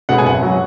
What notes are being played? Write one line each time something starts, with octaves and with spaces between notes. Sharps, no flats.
B2 G#3 B3 F#5
G#5
F#1 F#5
F#3